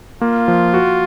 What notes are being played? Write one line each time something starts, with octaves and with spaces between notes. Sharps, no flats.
A#3 F4
F3
F#4